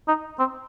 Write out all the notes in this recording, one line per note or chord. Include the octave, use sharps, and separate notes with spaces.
D#4
C4